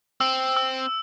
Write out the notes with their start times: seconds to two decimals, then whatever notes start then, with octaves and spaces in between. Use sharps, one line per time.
0.20 C4 E6
0.56 E6